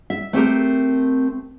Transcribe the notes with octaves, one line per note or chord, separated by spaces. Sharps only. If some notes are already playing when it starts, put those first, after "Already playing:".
E5
A3 C4 G4 A#4